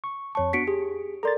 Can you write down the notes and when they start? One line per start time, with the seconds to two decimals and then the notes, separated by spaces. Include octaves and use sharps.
0.04 C#6
0.35 F2 C#5 A5 C#6
0.53 B3 D4 F#4 B6 C#7 D7
0.67 G4 G#4
1.23 A4 A#4 D5 A#5 C6 A6